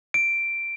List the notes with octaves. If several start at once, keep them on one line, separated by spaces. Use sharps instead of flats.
D7